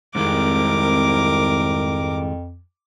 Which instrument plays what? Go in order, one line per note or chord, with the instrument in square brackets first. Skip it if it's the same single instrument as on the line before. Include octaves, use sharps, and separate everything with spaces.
[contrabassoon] C2 [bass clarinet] F2 [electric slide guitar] G#2 D#3 G#3 [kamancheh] A#4 D6